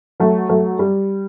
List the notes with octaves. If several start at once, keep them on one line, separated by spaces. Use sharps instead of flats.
F#3 A3
F#3 A3
G3